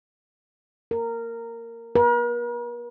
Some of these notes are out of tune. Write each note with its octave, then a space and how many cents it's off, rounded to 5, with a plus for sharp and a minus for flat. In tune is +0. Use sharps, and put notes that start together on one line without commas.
A#4 -15
A#4 +45